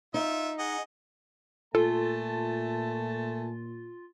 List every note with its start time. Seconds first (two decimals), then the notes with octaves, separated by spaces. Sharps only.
0.14 D#4 F4 E5
0.59 G#4 D#5 F#5
1.75 A#2 A3 F4 A4 G#5 A5